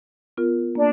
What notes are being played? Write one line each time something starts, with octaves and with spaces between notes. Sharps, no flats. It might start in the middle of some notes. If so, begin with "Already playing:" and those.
B3 F4 A#4
A#3 D4